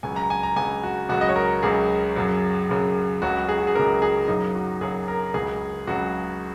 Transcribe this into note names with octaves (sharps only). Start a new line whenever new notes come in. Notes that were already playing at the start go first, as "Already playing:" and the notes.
C#2 C#3 F#3 G#5
A#5
G#5
A#5
C#2 C#3 F#3 G#5
F#4
C#2 C#3 F#3 F#4
D#5
C#5
A#4
C#2 C#3 F#3 G#4
F#2 C#3 F#3
F#2 C#3 F#3
C#2 C#3 F#3 F#4
G#4
F#4
G#4
C#2 C#3 F#3 A#4
G#4
F#2 C#3 F#3 D#4
F#4
F#2 C#3 F#3 G#4
A#4
C#2 C#3 F#3 G#4
C#2 C#3 F#3 F#4